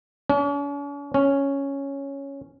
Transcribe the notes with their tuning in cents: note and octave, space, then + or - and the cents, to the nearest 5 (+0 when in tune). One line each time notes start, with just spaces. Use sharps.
C#4 +45
C#4 +0